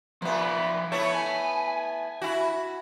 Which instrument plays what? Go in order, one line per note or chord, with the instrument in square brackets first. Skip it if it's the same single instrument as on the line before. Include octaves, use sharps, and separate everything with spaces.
[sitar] A#2 B3 [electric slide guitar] F3 E5
[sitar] A3 B3 E4 [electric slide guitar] C#5
[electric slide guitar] G#5
[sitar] E4 F#4